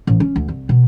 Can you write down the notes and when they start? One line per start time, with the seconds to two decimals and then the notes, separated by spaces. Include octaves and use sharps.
0.07 A1
0.20 C#4
0.36 D2
0.48 C2
0.69 B2